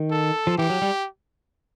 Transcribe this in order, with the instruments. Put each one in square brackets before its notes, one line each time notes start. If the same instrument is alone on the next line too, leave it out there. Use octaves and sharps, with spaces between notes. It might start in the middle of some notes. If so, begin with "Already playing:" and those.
Already playing: [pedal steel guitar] D#3
[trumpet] A4
[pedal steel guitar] F3
[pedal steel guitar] E3 [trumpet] G4
[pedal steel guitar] F#3
G3